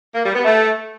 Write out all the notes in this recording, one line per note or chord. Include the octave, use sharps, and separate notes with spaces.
A#3
G3
B3
A3